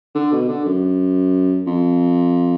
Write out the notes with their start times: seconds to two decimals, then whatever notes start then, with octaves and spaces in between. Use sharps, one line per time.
0.15 D3
0.32 B2
0.48 D3
0.65 F#2
1.66 F2